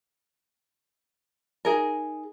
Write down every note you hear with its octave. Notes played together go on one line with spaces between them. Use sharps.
D#4 G#4 A#4